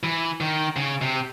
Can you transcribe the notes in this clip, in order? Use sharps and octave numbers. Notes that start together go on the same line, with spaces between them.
E3
D#3
C#3
C3